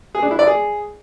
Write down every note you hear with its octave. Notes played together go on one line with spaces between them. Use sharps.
G#4
D4
E4
D5
G#4